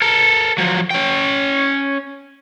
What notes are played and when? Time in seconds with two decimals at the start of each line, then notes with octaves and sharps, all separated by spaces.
0.02 A4 A#4
0.58 F3 F#3
0.91 C#4 G5